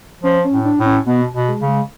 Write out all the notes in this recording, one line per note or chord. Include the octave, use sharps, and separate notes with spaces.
F3 C#4
C#4
A2
D4
A2
C#4
B2 B3
B2
G#3
C#3
G#3